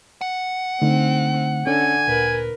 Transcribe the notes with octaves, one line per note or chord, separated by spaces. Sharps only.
F#5
D3 A3 C4 D#4
D3 C#4 G#5
D2 A#2 A#4 B4